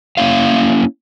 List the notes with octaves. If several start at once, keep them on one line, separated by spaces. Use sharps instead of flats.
A#3 C#4 E4 F5